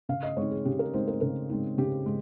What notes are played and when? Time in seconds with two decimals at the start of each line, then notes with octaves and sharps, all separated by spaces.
0.09 C#3 F5
0.23 D#5
0.37 G#3 C4 D#4 C#5
0.51 G#4
0.65 C#3 G4
0.79 A#4
0.93 G#3 C4 D#4 C5
1.08 A#4
1.21 C#3 A#4
1.49 G#3 C4 D#4
1.78 C#3 G4
2.06 G#3